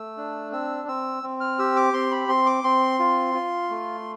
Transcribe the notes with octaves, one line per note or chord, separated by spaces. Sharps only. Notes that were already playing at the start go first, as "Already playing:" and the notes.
Already playing: A3 E6
D4
C4 E6
C4 E6
C4
F6
G4 E6
D6
C4 C6
B5
C4 C6
D6
C4 C6
F4
F4
A3